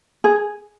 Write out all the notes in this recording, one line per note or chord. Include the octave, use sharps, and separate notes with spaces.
G#4